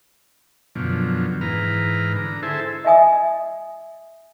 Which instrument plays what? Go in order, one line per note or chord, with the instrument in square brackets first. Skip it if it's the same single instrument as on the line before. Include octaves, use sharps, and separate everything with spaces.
[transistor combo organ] F#2 B2 D3 F3
G#2 E3 B4 A#5 F6
D3 A#5
E4 G#4 A4 C5 E5 A5
[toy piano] D#5 E5 G#5 D#6